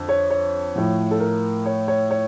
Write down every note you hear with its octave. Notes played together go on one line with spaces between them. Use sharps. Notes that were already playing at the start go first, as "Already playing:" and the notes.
Already playing: F2 D3
C#5
C#5
A2 F3
A4
A#4
C#5
C#5
C#5